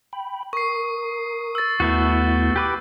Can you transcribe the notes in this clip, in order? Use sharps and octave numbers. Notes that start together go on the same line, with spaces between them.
G5 B5
A#4 C#6 D#6 C7
E6 A6
D#2 A3 B3 E4 F#4 G6
G4 B4 D6